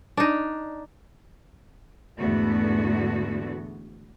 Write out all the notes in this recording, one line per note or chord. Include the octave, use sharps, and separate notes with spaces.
D4 D#4
E2 G#2 D3 A3 B3 F#4